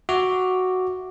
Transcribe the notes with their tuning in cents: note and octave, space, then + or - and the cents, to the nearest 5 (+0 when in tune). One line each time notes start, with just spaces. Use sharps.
F#4 +0 E5 +0 D6 +0